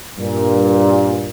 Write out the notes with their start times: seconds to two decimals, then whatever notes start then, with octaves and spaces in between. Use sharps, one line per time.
0.18 G2 A#2